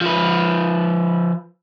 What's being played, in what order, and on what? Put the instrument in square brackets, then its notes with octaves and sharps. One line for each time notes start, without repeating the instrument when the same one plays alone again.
[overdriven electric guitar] F3 B4